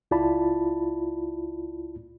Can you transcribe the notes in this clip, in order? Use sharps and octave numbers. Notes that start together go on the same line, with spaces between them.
C#2 E4 F4 D5 A5 B5